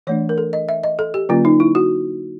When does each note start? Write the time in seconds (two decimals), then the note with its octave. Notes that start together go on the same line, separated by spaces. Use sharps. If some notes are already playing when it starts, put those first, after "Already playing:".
0.07 E3 A3 D4 C#5
0.29 A#4
0.38 A4
0.53 D#5
0.69 E5
0.84 D#5
0.99 A4
1.14 G4
1.29 D3 F#3 A#3 C#4 F4
1.45 D#4
1.60 E4
1.75 F#4